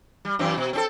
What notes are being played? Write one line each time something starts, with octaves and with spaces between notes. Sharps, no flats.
G3
F#2 E3 C4
B2
C4 C#4 A4